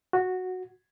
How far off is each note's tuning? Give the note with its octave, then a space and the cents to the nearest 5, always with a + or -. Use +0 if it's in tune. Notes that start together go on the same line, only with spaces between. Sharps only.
F#4 -5